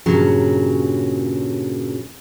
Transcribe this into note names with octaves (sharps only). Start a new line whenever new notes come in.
G2 A#2 C#3 F#3